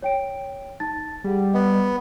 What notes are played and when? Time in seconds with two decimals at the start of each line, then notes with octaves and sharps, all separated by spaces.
0.02 C#5 G5 D7
0.80 D#4 A5 A6
1.24 G3 G#4 F#5
1.54 B3 D#5